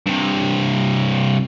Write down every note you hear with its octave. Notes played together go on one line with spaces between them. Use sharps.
G2 C3